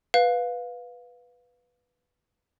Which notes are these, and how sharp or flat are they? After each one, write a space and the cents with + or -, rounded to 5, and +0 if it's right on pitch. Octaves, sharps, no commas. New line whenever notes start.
B4 +0 F5 +15